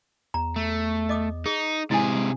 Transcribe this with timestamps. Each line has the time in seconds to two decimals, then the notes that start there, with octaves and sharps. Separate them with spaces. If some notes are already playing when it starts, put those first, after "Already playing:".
0.34 E2 A#5
0.56 A3
1.09 D#5 D6 D#6
1.46 D#4 G#4
1.91 C3 G#3 E4 G#4 G#5
2.15 G#3